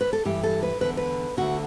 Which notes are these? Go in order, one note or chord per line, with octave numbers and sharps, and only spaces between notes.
B4
A4
G2 E3 G4
A4
B4
E2 D3 B4
B4
D2 D3 F#4